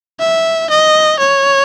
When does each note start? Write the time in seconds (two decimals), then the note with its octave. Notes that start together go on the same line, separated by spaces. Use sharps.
0.19 E5
0.70 D#5
1.19 C#5